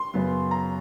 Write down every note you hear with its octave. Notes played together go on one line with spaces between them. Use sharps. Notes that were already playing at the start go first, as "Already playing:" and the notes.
Already playing: C6
F#2 C#3 F#3 B3
A#5